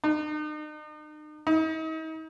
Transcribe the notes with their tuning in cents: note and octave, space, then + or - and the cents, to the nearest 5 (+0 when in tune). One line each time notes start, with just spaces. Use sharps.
D#4 -40
D#4 +40